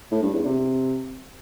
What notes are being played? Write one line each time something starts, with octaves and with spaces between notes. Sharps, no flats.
A2
G2
E2
C3